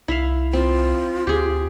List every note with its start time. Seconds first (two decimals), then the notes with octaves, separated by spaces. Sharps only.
0.08 C2 E4 E5 F5
0.53 C4 F4
1.27 D2 G4 G#4